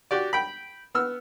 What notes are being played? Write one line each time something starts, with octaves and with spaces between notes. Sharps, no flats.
F#4 G4 D5
G5 B5
B3 E6 F6